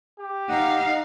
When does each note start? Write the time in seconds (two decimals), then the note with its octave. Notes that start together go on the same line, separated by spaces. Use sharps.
0.19 G4
0.49 D#4 F5 F#5